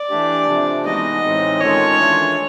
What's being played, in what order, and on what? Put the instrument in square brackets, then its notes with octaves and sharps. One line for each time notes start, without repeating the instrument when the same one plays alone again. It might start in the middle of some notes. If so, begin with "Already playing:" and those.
Already playing: [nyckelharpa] D5
[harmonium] E3 A3 D4 G4
C3 F3 A3 D4
[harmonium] E3 G#3 B3 D#4 F#4 [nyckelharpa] D#5
[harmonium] A2 E3 G#3 C4 D#4
[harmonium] D#3 G#3 C#4 F4 A4 [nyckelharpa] C#5
[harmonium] E3 A3 D4 F4